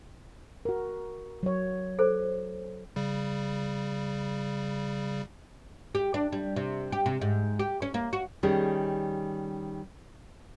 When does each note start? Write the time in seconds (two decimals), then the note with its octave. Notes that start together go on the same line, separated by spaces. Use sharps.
0.65 F#4 A#4
1.43 F#3 C#5
1.99 A4 C5
2.96 C#3 G3
5.95 G4
6.14 D4
6.33 G3
6.56 C3
6.92 G4
7.06 C3
7.21 G#2
7.59 G4
7.82 C#4
7.94 A#3
8.13 F#4
8.43 D#3 G3 C#4 G4 G#4